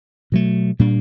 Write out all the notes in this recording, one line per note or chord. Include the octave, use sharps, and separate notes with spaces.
B2 F#3 A3
A#2 G3 A#3 D4